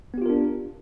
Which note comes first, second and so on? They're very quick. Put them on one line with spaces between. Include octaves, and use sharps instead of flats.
B3 G4 F4 A#4 D4